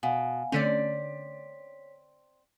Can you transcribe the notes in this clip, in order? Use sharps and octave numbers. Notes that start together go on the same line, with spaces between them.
B2 F5 F#5 G#5
D3 A3 C4 C#4 C#5 D5 B6